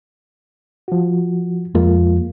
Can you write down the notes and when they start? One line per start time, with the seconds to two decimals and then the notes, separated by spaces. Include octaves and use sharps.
0.88 F3 F#4
1.75 F2 G#3 A#3 F4